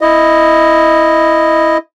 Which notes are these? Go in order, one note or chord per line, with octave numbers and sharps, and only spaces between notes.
E4 D#5